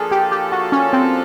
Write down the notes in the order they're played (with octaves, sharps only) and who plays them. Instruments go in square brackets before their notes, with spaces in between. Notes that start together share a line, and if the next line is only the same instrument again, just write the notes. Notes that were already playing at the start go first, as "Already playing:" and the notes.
Already playing: [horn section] F3 A#3 D4 F4 A4 [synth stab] G#4
[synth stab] G4
G4
F#4
C#4
C4